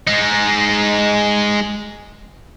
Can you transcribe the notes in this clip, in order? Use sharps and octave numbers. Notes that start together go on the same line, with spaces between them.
G#3 D#4